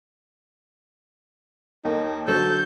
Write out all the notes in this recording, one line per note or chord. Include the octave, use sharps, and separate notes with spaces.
D#2 D#4 A4 A#4
D3 F#3 F#4 A4 C5 G6